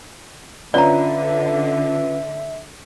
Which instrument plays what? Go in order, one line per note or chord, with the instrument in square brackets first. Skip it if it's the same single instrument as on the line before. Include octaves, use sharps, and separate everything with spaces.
[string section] D3 [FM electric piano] C#4 F4 B4 [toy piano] D5 A#5 [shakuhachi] E5